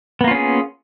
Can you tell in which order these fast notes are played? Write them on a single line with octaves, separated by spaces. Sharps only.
B3 A#3 F4 C#4 G#4